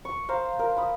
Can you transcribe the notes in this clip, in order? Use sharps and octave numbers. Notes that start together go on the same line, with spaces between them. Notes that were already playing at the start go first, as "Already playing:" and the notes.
C#6
C5 F5 A#5
A#4
B5 D#6